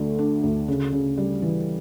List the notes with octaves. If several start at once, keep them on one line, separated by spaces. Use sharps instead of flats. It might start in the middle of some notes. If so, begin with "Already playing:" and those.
Already playing: D2 D3 A3
D4
D2
C#3
C#3
G3
E3